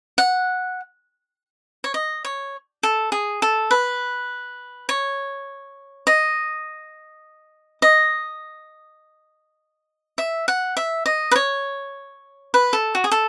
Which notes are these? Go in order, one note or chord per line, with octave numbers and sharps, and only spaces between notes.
F#5
C#5
D#5
C#5
A4
G#4
A4
B4
C#5
D#5
D#5
E5
F#5
E5
D#5
B4
C#5
B4
A4
F#4
G#4
A4